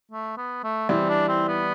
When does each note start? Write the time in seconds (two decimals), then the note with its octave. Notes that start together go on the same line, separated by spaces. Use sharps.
0.11 A3
0.37 B3
0.63 A3
0.89 E3 G3 C4
1.09 D4
1.28 C4
1.48 B3